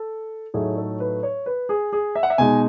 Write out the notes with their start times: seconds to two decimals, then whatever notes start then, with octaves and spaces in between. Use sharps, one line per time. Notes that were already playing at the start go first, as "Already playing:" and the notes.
Already playing: A4
0.54 A2 F#3 A3 D#4 G#4
0.77 A4
1.00 B4
1.23 C#5
1.46 B4
1.69 G#4
1.93 G#4
2.15 E5
2.23 F#5
2.30 E5
2.38 B2 G#3 D#4 G#5